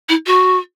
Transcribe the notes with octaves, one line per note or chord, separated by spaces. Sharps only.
E4
F#4